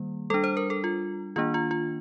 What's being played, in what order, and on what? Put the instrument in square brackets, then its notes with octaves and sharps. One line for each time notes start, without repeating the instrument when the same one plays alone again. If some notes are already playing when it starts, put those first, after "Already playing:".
Already playing: [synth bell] D#3 G3 A#3
G3 D4 A4
C5
A#4
A4
F4
D#3 A#3 D4 F4
F4
F4